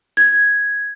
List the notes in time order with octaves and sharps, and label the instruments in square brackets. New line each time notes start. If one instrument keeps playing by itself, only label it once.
[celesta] G#6